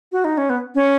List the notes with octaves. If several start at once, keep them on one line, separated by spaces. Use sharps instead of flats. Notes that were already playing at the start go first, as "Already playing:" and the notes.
F#4
D#4
C#4
B3
C#4